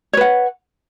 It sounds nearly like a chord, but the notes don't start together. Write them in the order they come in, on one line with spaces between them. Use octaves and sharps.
C#5 B4 F#5